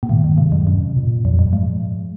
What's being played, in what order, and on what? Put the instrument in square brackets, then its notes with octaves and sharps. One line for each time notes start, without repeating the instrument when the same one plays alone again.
[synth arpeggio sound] A#2
[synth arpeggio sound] G#2 [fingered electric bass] D#3
[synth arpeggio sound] F#2
[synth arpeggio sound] G#2 [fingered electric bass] C3
[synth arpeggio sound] F#2
[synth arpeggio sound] F#2 [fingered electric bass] C#4
[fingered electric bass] A#2
[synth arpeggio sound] F2 [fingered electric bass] F3
[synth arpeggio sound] F#2
[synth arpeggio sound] G#2 [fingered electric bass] G#3